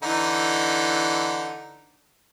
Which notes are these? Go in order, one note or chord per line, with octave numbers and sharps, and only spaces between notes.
D3 E3 D#4